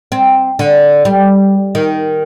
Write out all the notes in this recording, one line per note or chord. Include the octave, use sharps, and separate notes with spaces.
C4
D3
G3
D#3